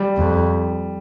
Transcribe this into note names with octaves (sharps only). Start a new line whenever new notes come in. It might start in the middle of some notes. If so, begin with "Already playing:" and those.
Already playing: G3
F2